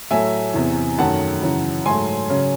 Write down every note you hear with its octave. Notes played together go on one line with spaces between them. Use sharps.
A2 F#3 A3 E5 G#5
E2 C3 E3
F#2 D#3 F#3 A3 F#5 A5
F#2 C#3 E3
G#2 F#3 A3 G#5 C6
C#3 F#3 C#4